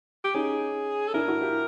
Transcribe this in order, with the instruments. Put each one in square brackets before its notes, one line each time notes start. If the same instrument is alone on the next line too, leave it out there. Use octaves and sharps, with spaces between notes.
[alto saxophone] G4
[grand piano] C#4 D#4 [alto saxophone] G#4
[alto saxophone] A4
[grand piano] D4 E4 [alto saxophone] A#4
[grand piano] E4 F#4
F4 G4